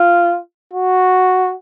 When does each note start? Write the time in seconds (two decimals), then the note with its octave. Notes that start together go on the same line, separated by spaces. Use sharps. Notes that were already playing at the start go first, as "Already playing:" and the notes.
Already playing: F4
0.74 F#4